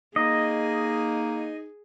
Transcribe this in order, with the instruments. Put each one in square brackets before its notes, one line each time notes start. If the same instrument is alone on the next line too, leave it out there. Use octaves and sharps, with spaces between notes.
[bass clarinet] A#3 [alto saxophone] D#4 [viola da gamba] G#4 [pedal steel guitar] D#5